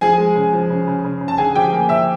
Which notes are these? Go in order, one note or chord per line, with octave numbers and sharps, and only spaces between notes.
F3 G#4 G#5
G#3
C#3
F3
C#3
C#3
C#3
C#3
A5
D3 G#4 G#5
F3 G4 G5
A#3
F3 E5 E6